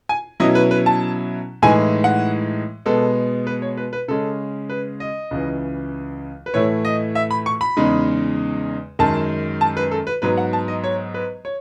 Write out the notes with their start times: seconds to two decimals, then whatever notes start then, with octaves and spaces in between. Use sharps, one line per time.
0.09 G#5
0.40 B2 F#3 C#4 E4 D#5
0.55 B4
0.71 B4
0.86 A5
1.62 A2 E3 G#3 D#4 G#5
2.04 F#5
2.86 B2 G#3 B3 A4
3.47 B4
3.62 C#5
3.77 B4
3.93 B4
4.08 C#3 G#3 C#4 A4
4.69 B4
5.00 D#5
5.31 C#2 C#3 E3
6.46 B4
6.54 A2 E3 A3 E4 C#5
6.85 D#5
7.15 E5
7.31 B5
7.46 C#6
7.61 B5
7.77 E2 C#3 G#3 D#4
8.99 F#2 D#3 G#3 A5
9.61 A5
9.77 B4
9.91 A4
10.07 B4
10.22 G#2 F#3 B3 B4
10.37 F#5
10.53 A5
10.68 D#5
10.84 C#5
11.14 B4
11.45 C#5